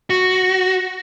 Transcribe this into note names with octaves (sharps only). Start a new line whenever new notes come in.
F#4